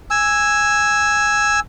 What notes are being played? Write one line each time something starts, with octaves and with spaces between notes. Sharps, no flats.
G#5 E6